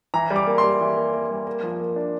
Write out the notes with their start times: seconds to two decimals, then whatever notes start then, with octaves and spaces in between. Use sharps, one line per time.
0.14 E3 A#5
0.31 G3
0.36 D6
0.47 A#3
0.58 C6
0.64 G3
0.81 E3
0.97 A#3
1.13 A#3
1.30 G3
1.47 A#3
1.63 F3
1.80 A#3
1.96 D4